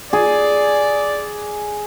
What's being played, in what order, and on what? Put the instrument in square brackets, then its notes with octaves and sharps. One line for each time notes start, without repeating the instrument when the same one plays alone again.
[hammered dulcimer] G#4 [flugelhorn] D5